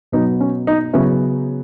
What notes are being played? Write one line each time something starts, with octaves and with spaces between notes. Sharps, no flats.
B2 F#3 B3 D#4
C#4
D#4
C#3 F#3 B3 C#4 E4